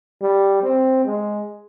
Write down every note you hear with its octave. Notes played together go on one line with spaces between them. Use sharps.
G3
C4
G#3